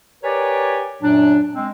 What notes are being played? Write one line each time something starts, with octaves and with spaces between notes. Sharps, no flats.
G4 A#4 B4 C#5 D5 G#5
F#2 A#2 F#3 D4
G#3 C4